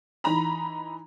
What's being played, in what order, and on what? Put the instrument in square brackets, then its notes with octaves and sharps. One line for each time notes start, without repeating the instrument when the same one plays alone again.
[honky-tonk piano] E3 D#4 A#5 B5